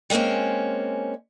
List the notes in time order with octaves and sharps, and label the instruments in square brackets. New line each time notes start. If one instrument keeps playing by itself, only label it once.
[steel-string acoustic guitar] G3 G#3 A#3 C4 C#4